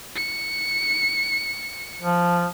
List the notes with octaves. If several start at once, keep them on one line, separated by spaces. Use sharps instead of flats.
C#7
F3